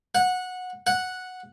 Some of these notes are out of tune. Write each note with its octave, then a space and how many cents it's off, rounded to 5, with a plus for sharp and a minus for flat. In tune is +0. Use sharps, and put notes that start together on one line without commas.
F#5 -15
F#5 -5